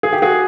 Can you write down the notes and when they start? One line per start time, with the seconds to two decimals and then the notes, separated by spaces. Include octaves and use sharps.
0.03 G#4
0.13 G4
0.22 F#4 G#4